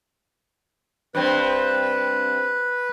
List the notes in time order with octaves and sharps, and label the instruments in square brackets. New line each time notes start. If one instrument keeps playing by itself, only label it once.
[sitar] G2 C4 [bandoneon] B4